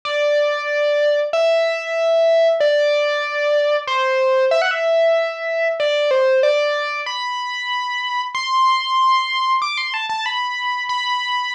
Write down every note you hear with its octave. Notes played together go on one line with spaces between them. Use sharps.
D5
E5
D5
C5
E5
F#5
E5
D5
C5
D5
B5
C6
D6
C6
A5
A5
B5
B5